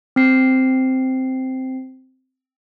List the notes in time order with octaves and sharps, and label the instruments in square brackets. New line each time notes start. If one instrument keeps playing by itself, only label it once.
[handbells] C4 C7